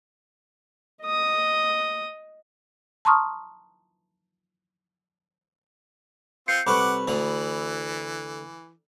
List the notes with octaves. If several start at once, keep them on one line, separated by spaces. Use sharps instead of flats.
D#5 D#6
A5 A#5 C6 C#6 D#6 F6
C4 F4 G6 C7 C#7
C2 A4 B4 F#5 B5 C#6 D6
D2 D3 E3 D#6